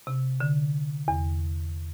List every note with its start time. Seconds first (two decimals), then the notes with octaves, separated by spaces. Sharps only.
0.07 C3
0.40 D3
1.08 E2